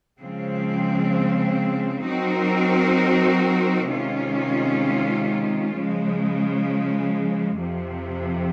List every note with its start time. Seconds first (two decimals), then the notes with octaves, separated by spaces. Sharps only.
0.21 C#3 F3 G#3 C4
2.06 F#3 C4 D#4 F#4 A#4
3.91 C3 D#3 G#3 C#4 F4
5.75 C#3 F3 G#3
7.60 F2 C3 F3